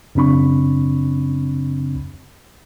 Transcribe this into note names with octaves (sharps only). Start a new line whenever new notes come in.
F#2 C#3 C4 D4 B5 C#6